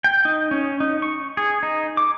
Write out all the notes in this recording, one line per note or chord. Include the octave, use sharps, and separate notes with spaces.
G5
D#4
C#4
D#4
C#6
G#4
D#4
D6